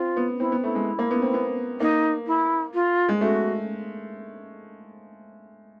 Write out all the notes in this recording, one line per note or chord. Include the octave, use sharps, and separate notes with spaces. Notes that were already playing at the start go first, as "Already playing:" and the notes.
Already playing: C4 F4
B3
C4 E4
B3
A3 E4
G#3
A#3
B3
C4
B3
A#3 D#4
E4
F4
G#3
A3 F#4